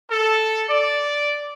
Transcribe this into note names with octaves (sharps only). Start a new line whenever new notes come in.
A4
D5